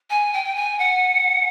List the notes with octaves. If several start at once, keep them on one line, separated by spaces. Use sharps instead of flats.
G#5
G5
G5
G#5
F#5